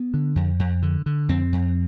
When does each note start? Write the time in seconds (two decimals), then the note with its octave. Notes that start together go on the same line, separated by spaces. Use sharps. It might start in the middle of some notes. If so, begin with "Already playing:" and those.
Already playing: B3
0.14 D3
0.36 F2
0.59 F2
0.82 D3
1.06 D3
1.29 F2 C4
1.53 F2